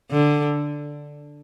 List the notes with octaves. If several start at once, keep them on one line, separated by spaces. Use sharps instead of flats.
D3